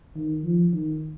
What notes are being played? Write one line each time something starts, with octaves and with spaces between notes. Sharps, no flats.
D#3
F3
D#3